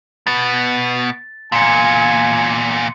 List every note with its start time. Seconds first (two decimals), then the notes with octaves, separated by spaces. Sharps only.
0.27 B2 B3 A6
1.52 E2 A#2 G#5 C6 C#7